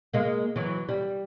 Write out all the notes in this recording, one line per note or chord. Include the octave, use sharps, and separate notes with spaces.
G#3 A#3
E3 F#3
G3